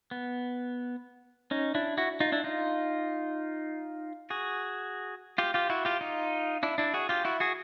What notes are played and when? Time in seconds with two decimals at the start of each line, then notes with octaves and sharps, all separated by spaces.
0.11 B3
1.51 C#4 D#4
1.75 D4 E4
1.98 E4 F#4
2.20 D#4 F4
2.32 D4 E4
2.44 D#4 F4
4.30 F#4 G#4
5.38 F4 G4
5.54 F4 G4
5.70 E4 F#4
5.85 F4 G4
6.01 D#4 F4
6.63 D4 E4
6.78 D4 E4
6.94 F#4 G#4
7.09 F4 G4
7.25 E4 F#4
7.40 F#4 G#4